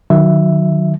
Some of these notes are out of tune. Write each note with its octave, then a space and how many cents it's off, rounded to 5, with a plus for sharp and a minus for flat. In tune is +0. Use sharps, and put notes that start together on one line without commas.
D#3 -35 F#3 -20 E5 +0